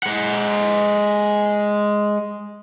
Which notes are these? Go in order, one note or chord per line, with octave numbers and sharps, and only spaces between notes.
G#3 F#5